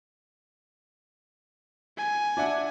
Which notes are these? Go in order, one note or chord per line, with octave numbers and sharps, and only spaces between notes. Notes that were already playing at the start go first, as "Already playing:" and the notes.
G#5
D4 E5 F#5